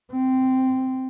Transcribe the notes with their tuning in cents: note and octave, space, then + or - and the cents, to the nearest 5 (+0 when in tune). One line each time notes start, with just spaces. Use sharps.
C4 -10